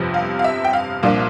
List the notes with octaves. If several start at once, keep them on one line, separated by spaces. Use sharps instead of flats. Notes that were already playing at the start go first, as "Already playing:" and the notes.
Already playing: G1 F2 C3 F3
F5
F5
E5
G5
F5
C2 A#2 F3 A#3 D4 F5